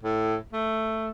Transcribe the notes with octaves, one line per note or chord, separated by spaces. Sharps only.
A2
A3